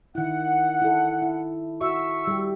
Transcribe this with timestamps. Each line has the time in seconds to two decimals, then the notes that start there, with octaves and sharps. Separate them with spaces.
0.15 D#3 E4 F#5
0.82 E4 A4
1.22 E4
1.81 F#4 E5 C#6 E6
2.27 G3 G4